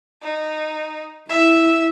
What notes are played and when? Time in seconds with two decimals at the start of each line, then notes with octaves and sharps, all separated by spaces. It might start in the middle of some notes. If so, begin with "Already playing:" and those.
0.23 D#4
1.30 E4 E5